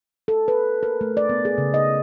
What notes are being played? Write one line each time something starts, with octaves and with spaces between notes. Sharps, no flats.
A4
B4
A#4
A3
D5
B3
G#4
C#3
D#5